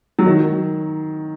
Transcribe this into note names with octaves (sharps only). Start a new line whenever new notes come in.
F#3
D#3